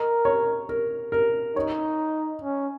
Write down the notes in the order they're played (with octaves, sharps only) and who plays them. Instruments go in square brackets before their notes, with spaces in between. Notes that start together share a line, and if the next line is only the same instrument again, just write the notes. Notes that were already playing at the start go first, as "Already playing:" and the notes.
Already playing: [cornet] A#4 [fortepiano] D#5
[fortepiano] C#5
A#4
A#4
[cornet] D#4 [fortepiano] C#5
[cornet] C#4